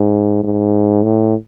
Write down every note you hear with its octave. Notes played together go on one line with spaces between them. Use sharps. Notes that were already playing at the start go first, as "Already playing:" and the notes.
Already playing: G#2
G#2
A2